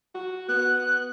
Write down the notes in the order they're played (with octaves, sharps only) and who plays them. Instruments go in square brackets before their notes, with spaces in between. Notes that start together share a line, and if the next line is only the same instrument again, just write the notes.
[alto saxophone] F#4
[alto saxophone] B3 [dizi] F#6